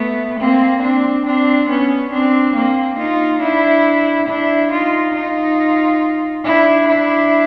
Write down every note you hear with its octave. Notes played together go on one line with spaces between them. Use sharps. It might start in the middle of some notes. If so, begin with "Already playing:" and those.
Already playing: A3 B3
A#3 C4
C4 D4
C4 D4
B3 C#4
C4 D4
A#3 C4
D#4 F4
D4 E4
D4 E4
D#4 F4
D#4 F4
D4 E4
D4 E4